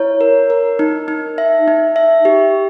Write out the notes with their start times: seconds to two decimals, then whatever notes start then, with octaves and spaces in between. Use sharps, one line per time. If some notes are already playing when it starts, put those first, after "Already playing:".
Already playing: E4 C#5
0.21 A#4
0.50 A#4
0.79 D#4
1.08 D#4
1.38 E5
1.68 D#4
1.96 E5
2.25 G4